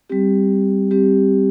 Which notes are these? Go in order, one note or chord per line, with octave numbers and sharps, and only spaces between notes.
G3 C4 G4
G3 C4 G4